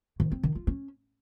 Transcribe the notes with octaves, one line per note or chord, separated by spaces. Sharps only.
D#3
C4
D#3
F4
C#4